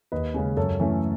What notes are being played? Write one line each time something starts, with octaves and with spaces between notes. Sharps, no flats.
D#2 B4 D#5
C#3 G#3 C#4
F#2 A4 C#5
E3 A3 C#4